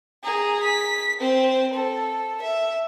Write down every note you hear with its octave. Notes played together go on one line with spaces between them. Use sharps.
G#4 A#5
B6
C4 C5
A4
E5